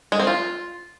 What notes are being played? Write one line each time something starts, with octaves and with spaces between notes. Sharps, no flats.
G#3
C4
F4